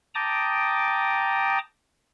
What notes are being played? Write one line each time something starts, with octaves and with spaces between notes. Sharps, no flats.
G5 A5 A#5 D6 D#6